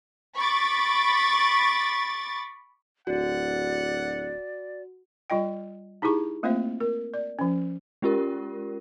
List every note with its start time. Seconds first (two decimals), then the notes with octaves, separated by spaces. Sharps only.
0.36 B5 C#6 D6 A6
3.07 D1 F#4 D5 F#5
5.30 G3 F4 D#5 G5
6.02 D#4 E4 G4 G#4 C#6
6.43 A3 A#3 C4 F4 C5 E5
6.80 A#4
7.14 D5
7.39 F3 C#4
8.02 G#3 C#4 F4 G4 A#4